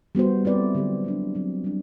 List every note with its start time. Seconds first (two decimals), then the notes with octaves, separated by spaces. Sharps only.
0.15 G3 B3 F#4 C5
0.45 A3 C4 E4 B4 D5
0.75 D3 F#3 C4 G4
1.04 F#3 B3 D4
1.34 D3 F#3 C4 E4
1.64 G3 D4